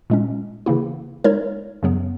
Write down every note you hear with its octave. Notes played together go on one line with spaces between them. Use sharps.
A#2 G#3 C#4
C#3 E3 A#3 E4
G#3 D#4 A#4 C#5
F#2 C#3 F#3 B3